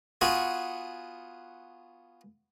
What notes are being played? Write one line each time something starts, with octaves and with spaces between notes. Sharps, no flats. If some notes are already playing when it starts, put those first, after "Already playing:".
B3 F4 F#4 G#4